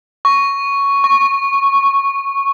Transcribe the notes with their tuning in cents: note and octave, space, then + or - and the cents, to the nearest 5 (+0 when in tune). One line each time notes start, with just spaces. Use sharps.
C#6 +5
C#6 -10